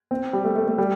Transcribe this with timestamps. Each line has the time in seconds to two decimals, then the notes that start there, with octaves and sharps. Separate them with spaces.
0.11 C4
0.33 G3
0.44 A3
0.56 A3
0.67 A3
0.78 G3